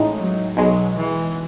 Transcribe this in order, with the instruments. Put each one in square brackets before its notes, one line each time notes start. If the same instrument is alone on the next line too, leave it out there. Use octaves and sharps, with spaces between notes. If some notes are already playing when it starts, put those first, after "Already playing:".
Already playing: [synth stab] A1 A2 G#3 D#4
[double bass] F#3
[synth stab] B1 B2 G#3 [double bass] F#3
[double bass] E3